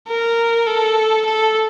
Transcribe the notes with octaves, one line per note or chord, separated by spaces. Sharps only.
A#4
A4
A4